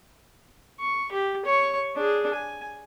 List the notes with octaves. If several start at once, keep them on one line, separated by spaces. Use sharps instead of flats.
C#6
G4
C#5 C#6
D4 G#4
G#5